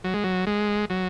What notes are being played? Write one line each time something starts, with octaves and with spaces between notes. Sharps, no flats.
F#3
G#3
F#3
G#3
F#3